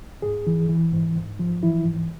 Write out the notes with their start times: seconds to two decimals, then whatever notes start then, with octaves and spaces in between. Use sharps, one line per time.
0.22 G#2 G#4
0.47 E3
0.69 E3
0.93 G#2
1.16 G#2
1.39 F3
1.63 E3 E4
1.85 G#2